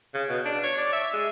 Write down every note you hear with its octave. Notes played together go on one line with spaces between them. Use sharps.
C#3
B2
D4
C#5
D5
E5
G#3